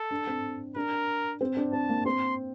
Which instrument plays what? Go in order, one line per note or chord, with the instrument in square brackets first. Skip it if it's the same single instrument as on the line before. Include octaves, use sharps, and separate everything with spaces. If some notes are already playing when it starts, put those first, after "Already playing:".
Already playing: [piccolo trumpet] A4
[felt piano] D4
C4
[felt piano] D4 [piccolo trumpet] A#4
[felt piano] C4
D4
[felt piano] C4 [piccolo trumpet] A5
[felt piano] A#3
[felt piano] C4 [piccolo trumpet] C6